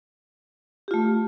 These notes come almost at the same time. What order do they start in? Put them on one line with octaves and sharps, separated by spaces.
G4 F4 A3